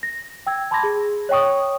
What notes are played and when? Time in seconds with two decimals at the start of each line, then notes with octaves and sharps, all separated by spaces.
0.03 A#6
0.46 G5 E6 G#6
0.71 A5 B5 C6 D6 G#6 A#6
0.83 G#4
1.29 C#5 D#5 G5 C#6 D#6